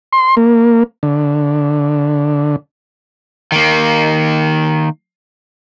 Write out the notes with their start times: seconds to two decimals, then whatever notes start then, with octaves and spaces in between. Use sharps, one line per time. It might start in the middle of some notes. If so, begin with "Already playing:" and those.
0.13 C6
0.37 A#3
1.03 D3
3.52 D#3 A#3